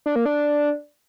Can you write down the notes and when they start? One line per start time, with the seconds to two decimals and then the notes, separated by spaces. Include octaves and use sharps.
0.06 D4
0.16 A#3
0.25 D4